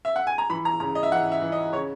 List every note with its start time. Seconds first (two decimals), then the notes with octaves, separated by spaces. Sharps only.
0.05 E5
0.16 F#5
0.27 G#5
0.38 A#5
0.49 E3 B5
0.65 A#5
0.80 C#3 A#5
0.95 D#5
1.03 E5
1.12 E3 F#5
1.32 E5
1.42 E3
1.52 D#5
1.73 C#3 C#5